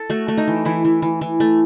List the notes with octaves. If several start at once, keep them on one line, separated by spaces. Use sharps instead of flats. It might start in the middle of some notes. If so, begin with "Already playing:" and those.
Already playing: A4
A3 F#4
A3
D#4
E3
E3 E4
E3
E3
E3
A3